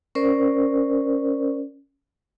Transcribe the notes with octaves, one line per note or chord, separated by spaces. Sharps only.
C#4 A#4 C5 D5